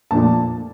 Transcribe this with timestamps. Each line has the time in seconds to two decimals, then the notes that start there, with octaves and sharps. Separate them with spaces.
0.11 A#2 F3 A3 D4 A5